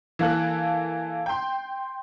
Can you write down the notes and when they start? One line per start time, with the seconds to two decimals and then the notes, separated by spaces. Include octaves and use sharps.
0.19 E3 A#3 A4 F#6
1.26 G5 C6